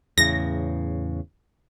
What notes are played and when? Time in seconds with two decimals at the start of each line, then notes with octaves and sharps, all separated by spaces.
0.18 E2 A2 C#3 A#6